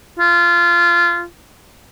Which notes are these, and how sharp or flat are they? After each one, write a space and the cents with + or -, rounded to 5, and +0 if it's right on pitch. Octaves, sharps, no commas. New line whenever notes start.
F4 -20